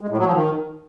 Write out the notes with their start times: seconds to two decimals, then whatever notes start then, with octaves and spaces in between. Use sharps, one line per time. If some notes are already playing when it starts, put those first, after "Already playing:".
0.01 G#3
0.09 A2
0.17 F#3
0.25 F3
0.33 D#3